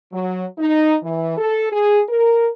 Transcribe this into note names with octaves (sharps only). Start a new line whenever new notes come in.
F#3
D#4
E3
A4
G#4
A#4